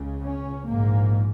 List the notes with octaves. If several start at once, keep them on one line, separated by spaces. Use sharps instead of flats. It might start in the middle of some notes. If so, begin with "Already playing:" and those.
Already playing: C#2 C#3
C#4
A#1 G#2 A#3